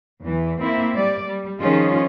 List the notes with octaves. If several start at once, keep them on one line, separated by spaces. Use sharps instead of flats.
E2 E3
A#3 C4 E4 E5
G3 D5
G3
D#3 F3 C#4 D#4 F4 G#4